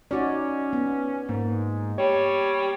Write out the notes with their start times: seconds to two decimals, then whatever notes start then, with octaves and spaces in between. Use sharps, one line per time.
0.11 C#4 D#4 F#4 D5
0.73 B3
1.29 G#2 A#3
1.98 G3 C#5